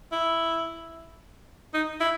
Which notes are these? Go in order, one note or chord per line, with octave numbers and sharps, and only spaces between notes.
E4
D#4
E4